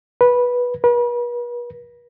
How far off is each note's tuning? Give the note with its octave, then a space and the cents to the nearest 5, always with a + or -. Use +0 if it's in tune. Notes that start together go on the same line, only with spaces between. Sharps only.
B4 -10
B4 -40